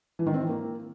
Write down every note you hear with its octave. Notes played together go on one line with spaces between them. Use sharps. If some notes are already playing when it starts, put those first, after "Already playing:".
E3
D#3
C4
E3
A#3